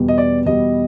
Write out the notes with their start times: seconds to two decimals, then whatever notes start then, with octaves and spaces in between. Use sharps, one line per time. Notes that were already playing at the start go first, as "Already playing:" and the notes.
Already playing: E2 B2 G3 B3
0.08 D#5
0.18 D5
0.46 E2 B2 G3 B3 D#5